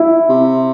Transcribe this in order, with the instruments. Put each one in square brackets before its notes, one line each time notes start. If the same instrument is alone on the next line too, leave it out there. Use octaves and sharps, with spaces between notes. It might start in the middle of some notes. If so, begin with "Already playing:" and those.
Already playing: [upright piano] E4
[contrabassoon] C3